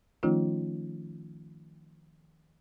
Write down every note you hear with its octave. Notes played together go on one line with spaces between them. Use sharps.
D#3 F3 A3 C#4 D#4 F4